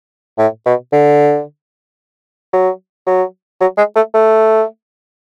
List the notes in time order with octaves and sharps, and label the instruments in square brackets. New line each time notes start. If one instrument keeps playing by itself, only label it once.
[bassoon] A2
B2
D3
F#3
F#3
F#3
G#3
A3
A3